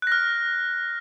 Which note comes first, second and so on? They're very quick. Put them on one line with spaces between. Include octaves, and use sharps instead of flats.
F#6 A#6 F6